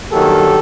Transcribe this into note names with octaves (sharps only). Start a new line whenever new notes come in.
G2 D#3 F#3 A#3 G4 A4